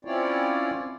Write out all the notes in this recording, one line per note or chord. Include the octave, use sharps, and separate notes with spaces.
C4 C#4 E4 F4 C#5 D5